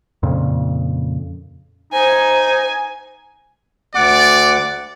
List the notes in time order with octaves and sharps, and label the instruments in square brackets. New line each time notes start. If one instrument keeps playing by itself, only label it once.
[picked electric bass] F2 A#2 C#3
[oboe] D#4 [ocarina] C5 [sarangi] G#5
[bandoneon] D2 F#5 D6 [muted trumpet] D5